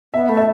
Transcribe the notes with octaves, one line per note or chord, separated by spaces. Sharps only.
B3 E5
A3
E5